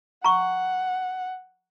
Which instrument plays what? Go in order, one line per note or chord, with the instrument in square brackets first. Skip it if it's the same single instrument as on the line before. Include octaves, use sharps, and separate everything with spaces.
[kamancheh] F#5 [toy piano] A#5 C#6